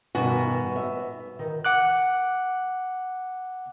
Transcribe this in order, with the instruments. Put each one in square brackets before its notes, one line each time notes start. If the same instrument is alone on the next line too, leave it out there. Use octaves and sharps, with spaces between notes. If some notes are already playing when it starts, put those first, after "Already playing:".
[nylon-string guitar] G2 B2 D#3 [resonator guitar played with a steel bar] B3 F#4 G#5
[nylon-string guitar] E5
D#3
[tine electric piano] F#5 D6 F#6